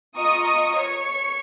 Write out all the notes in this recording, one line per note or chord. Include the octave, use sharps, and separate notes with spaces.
F4 D#5 A#5 C#6 D#6
C#5 C#6 C#7